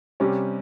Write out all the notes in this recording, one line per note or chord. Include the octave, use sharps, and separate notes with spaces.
C3 G3 C#4 G4